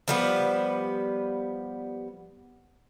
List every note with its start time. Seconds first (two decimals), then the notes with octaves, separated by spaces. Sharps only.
0.08 F3 G3 B3